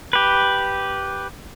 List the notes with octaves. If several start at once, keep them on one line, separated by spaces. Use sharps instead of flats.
G4 B4